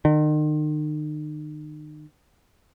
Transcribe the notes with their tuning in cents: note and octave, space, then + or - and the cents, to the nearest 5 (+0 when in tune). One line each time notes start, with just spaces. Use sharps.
D#3 -40